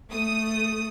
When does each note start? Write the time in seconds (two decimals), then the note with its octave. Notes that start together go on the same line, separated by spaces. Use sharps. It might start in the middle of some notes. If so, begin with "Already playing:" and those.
0.11 A3 D#6